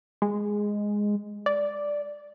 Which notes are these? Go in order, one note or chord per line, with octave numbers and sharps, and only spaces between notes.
G#3
D5